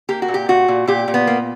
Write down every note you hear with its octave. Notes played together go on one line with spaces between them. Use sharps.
A#3 G4
F#4
A#2
G4
A#2 F#4
A#2
A#2 G4
A#2
B3
A#3